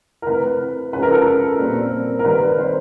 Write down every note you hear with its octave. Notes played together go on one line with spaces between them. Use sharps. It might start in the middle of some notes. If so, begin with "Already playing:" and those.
A#4
E3 A3 C4 B4
F3 G#3 C#4 B4
A#4
A4
A#4
A#2 G3 C4
A#4
D#3 G3 C4 B4
C5